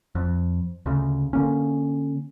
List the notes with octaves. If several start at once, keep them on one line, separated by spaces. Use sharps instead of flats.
F2
D2 C#3
D3 A#3 C#4